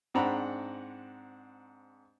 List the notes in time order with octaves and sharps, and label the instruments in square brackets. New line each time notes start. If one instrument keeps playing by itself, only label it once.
[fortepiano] G#2 C4 D4 F#5 A#5 B5